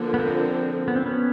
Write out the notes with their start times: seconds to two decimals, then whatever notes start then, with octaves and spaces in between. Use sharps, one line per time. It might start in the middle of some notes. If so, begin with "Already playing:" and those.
Already playing: D3 F3 A#3
0.14 B3
0.19 C4
0.88 B3
0.96 C4
1.06 B3 C#4